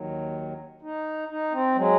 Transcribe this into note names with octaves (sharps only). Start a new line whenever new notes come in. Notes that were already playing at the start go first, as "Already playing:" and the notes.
Already playing: D#2 D#3 F#3
D#4
D#4
C4
F#3 G#3